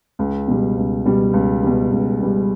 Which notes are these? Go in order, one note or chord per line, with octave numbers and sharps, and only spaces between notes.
C#2
B2 G3
C#2
B2 G3
C#2
B2 G3
C#2
B2 G3